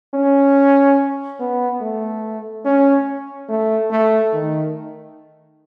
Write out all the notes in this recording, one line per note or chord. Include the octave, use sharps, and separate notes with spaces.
C#4
B3
A3
C#4
A3
A3
D#3